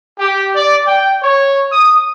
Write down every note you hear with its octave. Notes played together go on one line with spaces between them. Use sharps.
G4
D5
G5
C#5
D#6